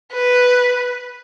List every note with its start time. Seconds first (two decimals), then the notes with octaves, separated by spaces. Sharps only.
0.12 B4